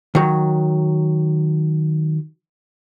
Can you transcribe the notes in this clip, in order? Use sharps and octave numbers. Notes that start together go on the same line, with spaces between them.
D#3 F#3